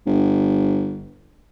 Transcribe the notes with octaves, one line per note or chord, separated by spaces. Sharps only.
G1